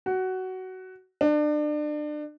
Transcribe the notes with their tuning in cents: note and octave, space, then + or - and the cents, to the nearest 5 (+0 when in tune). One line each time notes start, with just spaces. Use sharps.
F#4 +15
D4 +30